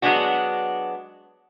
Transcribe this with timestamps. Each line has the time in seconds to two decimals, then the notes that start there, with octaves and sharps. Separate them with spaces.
0.02 F#3 G#3 B3 C#4 D4 F#4